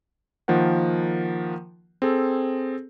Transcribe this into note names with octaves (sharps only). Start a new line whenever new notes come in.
D#3 F3 A#3 A#4 F#5
C4 G#4 A4